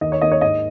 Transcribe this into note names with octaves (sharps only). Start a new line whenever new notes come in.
D#2 D#5
C#5
D#3 A#3 D#5
C#5
G#2 D#5